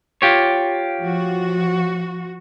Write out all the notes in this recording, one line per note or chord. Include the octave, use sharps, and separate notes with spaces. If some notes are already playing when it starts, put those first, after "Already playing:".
F4 G4 C#5
F3 F#4